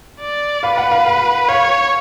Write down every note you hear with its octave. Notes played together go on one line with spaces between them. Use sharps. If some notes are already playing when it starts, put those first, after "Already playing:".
D5
B4 F5
F#5
F5
F5
C#5 F5